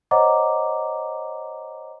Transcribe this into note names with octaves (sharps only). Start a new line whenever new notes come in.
C5 C#5 D#5 F#5 A#5 D6